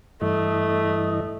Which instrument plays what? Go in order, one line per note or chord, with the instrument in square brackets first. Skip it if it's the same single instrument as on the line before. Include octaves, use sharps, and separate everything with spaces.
[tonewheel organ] G2 E3 D#5 [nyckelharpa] A3